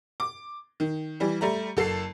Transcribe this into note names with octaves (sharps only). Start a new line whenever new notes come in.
D6
D#3
E3 G3
G3 A3 A#5
F#1 A4 A5 C7